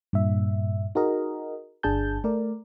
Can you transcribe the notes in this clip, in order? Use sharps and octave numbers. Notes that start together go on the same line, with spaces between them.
G2 A#2 E5
D#4 F#4 G#4 A#4 D#5
G1 D4 G#4 A5 G6
A3 A#4 D5